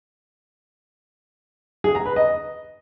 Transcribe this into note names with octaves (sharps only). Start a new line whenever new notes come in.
G#4
A#5
B4
D#5